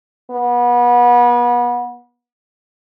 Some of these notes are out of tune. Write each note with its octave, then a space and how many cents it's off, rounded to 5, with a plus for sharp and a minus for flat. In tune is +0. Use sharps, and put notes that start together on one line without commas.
B3 -30